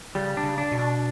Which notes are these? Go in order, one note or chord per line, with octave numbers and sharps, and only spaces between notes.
C#3 G3
D4
C#3
D4
B2
D4